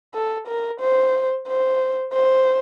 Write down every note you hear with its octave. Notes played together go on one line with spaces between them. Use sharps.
A4
A#4
C5
C5
C5